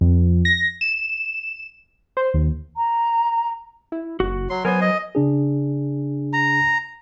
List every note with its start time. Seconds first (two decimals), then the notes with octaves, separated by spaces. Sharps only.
0.01 F2
0.45 A#6
0.81 E7
2.17 C5
2.34 D#2
2.77 A#5
3.92 E4
4.20 F#1 F#4
4.50 F#3 C6
4.65 F#3 B3 A#4 C5 G#5
4.81 D#5
5.15 C#3 D4 G#4
6.33 A#5